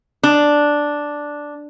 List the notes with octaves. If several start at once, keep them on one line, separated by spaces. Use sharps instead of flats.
D4